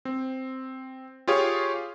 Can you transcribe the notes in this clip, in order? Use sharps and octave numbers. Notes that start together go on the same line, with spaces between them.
C4
F4 G4 G#4 C#5 F5